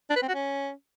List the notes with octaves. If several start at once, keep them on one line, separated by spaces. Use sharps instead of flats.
D4
B4
C4
F#4
C#4